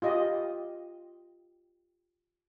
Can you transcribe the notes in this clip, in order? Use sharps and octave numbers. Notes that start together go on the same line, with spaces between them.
F4 G4 D#5